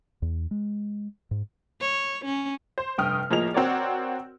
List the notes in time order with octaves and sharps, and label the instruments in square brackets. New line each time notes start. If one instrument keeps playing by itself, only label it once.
[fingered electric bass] E2
G#3
G#2
[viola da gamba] C#5
C#4
[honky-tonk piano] C5
F1 G2 G5 D#6 F6
A2 F3 A#3 G#4 D#5 F7
C4 F#4 A#4 C#5 D5